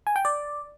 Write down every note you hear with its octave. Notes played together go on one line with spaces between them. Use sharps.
G#5
G5
D5